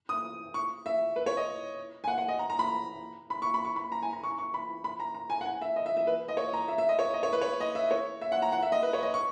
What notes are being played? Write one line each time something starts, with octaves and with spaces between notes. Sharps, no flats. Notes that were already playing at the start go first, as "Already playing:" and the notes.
D#6
C#6
E5
B4
C#5
D#5
G#5
F#5
F#5
D#5
A#5
A#5
B5
B5
C#6
B5
C#6
B5
A#5
G#5
A#5
C#6
C#6
B5
B5
A#5
A#5
G#5
F#5
G#5
E5
D#5
E5
E5
B4
D#5
C#5
A#5
E5
E5
D#5
C#5
D#5
C#5
B4
C#5
D#5
E5
C#5
E5
F#5
A#5
F#5
E5
D#5
B4
C#5
D#5
C#6